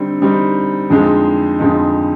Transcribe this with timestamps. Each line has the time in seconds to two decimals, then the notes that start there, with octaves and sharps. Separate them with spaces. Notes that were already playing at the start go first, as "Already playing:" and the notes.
Already playing: D3 G3 C4 D#4
0.20 D3 G3 C4 D#4
0.90 F2 D3 F3 G#3 D#4
1.59 F2 D3 F3 G#3 D#4